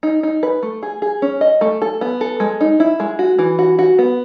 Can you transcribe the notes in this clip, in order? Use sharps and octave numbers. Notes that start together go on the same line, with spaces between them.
D#4
D#4
B4
A3
G#4
G#4
C#4
D#5
A3
A4
B3
A4
G#3
D#4
E4
G#3
F#4
E3
F#4
F#4
B3